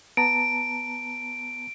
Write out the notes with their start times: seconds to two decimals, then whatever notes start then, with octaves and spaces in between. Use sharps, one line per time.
0.17 B3 A5 A#5 D7